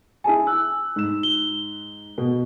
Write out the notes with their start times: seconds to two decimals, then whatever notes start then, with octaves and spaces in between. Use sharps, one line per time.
0.24 E4 G#4 G#5 A5
0.47 E6 F#6
0.96 G#2 E7
1.23 G7
2.18 B2